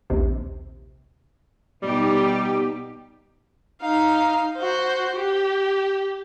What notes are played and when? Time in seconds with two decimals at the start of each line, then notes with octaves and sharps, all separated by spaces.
0.10 A#1 D#2 C3
1.82 B2 G3 D#4 G4
3.82 D#4 F5
4.58 F#4 C5
5.16 G4